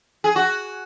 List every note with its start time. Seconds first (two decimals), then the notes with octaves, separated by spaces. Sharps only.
0.24 G#4
0.36 F#4